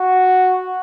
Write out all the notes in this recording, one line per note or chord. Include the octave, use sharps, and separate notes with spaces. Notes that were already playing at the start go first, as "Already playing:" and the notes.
Already playing: F#4